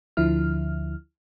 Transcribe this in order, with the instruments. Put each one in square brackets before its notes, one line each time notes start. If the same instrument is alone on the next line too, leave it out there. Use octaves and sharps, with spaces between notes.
[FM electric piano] D2 D3 F3 E4 F6